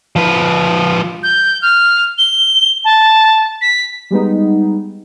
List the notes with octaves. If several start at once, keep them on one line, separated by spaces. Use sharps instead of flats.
F3 B4
G6
F6
G7
A5
B6
G3 G#3 B3 D#4